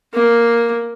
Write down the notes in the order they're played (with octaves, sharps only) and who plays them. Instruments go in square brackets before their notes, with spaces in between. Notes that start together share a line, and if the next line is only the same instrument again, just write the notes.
[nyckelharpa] A#3